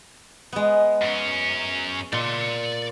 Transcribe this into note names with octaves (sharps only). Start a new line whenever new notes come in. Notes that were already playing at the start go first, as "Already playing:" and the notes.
G#3 B3
F#2 C#4
A#2 D5 C6